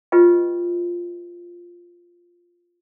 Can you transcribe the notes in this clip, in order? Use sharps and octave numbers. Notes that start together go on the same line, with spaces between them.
F4 G4 B4 D#5 G5